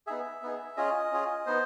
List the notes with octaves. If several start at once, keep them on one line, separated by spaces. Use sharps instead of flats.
B3 D#4 G#4 E5
B3 D#4 G#4
C#4 F4 G#4 D#5
C#4 F4 G#4
B3 D#4 C5